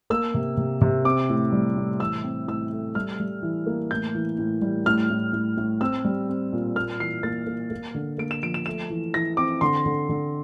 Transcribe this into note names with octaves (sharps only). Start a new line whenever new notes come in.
A#3 E6
C3
C3
C3
C4 D6
A2
G3
A2
E3 E6
C4
A2 E6
A3
G3 F6
G3
E3
A#3
A2 G6
E3
A2
G3
A2 F6
A2
A2
A2
C4 E6
G3
C4
A#2
A#3 F6
E3 C7
A#3 A6
A#3
A#3
D3
A#3 D7
E7
F3 D7
E7
A3 E7
E3
E3 A#6
C4 D6
D3 C6
D3
D3